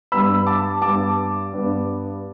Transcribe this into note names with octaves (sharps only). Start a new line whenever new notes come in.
G2 G3 B3 B5 E6
A5 D6
G2 G3 B3 A5 D6
G2 G3 B3